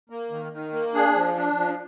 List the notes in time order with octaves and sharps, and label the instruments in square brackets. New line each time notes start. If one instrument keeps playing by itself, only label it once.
[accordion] A#3
D#3
D#3
A#3
D4 G#4
F3
D4
F3